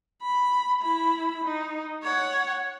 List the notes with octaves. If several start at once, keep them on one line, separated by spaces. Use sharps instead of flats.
B5
E4 B5
D#4
C#5 F#5